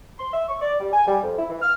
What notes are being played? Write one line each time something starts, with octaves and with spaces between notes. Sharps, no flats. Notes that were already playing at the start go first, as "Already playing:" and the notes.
C6
E5
C#6
D5
G3
G#5
G3
F2
E4
E3
F6